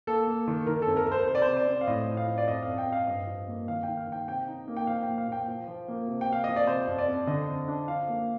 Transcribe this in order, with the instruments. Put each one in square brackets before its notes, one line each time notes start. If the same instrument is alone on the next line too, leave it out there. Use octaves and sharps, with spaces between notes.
[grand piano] A#3 A4
A#3
D#3
D#3 A#4
F2 A4
A#4
F2 A#4 C5
C3 C5
D5
C3 C5
D5
C4
F5
A2 D#5
F3
F5
F3
D5
F2 D#5
F2 F5
G5
F2
F5
G2 D#5
F3
A#3
D#3 F5
D#3 G5
F5
D#3
G5
C3 G5
D#4
A#3
G5
F3 F5
G5
A#2
F5
A#2 G5
F3
F3
A#3
C3
G5
C3 F5
F3 D#5
D5
C3 C5
F2
D5
F2
D3 D#5
F2
D4
F3 F5
A#3